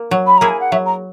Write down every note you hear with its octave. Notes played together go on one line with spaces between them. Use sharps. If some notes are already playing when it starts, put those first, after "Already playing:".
Already playing: A#3
F#3
B5
A#3 E4 G#4 A#5
G#5
F#5
F#3 E5
A#5